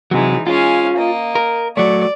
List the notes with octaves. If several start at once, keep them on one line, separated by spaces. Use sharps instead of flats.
C3 E3 F#3 G#3 D#4
G#3 C#4 F4 F5
A#3 D#5
A#4
F#3 A3 D5